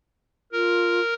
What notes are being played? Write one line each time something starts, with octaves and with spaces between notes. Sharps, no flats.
F4 A#4